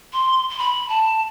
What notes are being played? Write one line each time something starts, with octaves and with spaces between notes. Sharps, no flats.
C6
C6
B5
A5